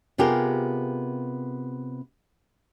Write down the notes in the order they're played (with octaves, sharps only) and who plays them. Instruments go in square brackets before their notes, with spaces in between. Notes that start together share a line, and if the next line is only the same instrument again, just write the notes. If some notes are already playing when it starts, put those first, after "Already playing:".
[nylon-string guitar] C3 B3 F4 G4 G#4 A#4